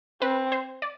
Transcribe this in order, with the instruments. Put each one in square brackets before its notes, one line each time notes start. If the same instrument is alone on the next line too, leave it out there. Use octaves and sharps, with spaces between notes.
[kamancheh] C4 [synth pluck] B4
[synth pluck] C5
D5